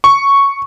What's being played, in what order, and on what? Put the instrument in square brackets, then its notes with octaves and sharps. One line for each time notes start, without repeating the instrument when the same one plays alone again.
[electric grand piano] C#6